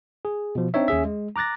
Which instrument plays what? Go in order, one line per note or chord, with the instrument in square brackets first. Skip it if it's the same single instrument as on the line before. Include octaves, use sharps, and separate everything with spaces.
[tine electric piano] G#4
B2 F3
C4 D4 D#4 C#5 E5
D#2 C#4 G#4 E5
G#3
A#5 D6 F#6 A6 A#6